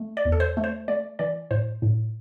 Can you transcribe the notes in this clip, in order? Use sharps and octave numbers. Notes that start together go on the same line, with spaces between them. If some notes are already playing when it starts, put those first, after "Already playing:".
Already playing: A3
D5
E2
A4
C5
A3
C5
A3 D5
E3 D5
A2 C5
A2